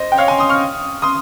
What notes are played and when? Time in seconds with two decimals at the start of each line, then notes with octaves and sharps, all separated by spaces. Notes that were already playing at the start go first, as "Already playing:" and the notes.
Already playing: C5 D#5
0.12 G5
0.17 C#5 F5
0.28 G#5 C6
0.39 C6 D#6
0.49 C#6 F6
1.02 C6 D#6